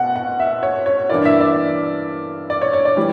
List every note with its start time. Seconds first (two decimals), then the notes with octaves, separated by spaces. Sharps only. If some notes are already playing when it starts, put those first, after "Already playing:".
Already playing: B2 F#5
0.16 F#5
0.40 E5
0.63 C#5
0.86 C#5
1.09 G2 E3 A#3 E4 D5
1.25 E5
1.40 D5
2.50 D5
2.62 C#5
2.73 C#5
2.85 D5
2.97 E3 G3